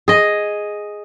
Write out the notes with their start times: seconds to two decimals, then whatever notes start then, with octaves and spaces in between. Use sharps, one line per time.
0.08 G#4 D#5